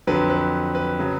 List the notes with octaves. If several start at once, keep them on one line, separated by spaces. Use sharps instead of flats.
F2 D3 F#3 B4
B4
B4
C#3 F#3